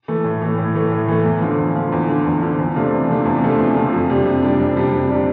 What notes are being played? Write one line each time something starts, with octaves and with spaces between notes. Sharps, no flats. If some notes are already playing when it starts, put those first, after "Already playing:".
E3 A3
A2
E3 A3
A2
E3 A3
A2
E3 A3
E2
D3 F3
E2
D3 F3
E2
D3 F3
E2
D3 F3
E2
C3 F3 A3 D4
E2
C3 F3 A3 D4
E2
C3 F3 A3 D4
E2
C3 F3 A3 D4
F2
C3 G3 D4
F2
C3 G3 D4
F2
C3 G3 D4
F2
C3 G3 D4